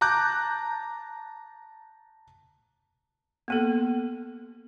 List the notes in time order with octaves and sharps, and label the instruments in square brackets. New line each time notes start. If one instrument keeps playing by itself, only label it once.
[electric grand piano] A5 A#5 D6 F#6 G6
[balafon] A#3 B3 A4